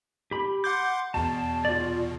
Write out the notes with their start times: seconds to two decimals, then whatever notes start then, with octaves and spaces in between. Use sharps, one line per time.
0.31 G4 B5
0.64 F#5 C6 D6 G6
1.14 E2 B2 A5
1.65 F4 D5